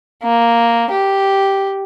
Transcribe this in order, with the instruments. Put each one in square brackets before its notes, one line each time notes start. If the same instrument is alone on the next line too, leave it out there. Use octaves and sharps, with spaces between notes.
[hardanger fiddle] A#3
G4